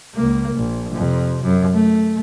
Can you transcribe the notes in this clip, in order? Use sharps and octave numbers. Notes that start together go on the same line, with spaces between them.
C#2 A#3
A#1
F2 C3
F#2
A3